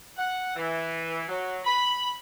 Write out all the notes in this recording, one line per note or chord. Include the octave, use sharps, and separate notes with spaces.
F#5
E3
F#3
B5